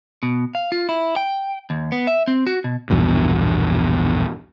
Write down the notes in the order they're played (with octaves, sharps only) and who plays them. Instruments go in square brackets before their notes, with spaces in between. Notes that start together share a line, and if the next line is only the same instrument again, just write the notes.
[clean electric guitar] B2
F5
F4
E4
G5
D#2
B3
E5
C4
F#4
B2
[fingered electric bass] A#1 E2 G2 B2